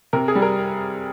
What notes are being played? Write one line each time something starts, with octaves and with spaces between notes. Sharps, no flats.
C3 A#4
G#4
G3
A#4